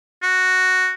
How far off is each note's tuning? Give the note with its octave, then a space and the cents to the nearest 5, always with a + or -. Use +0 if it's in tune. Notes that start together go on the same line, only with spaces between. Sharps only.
F#4 +0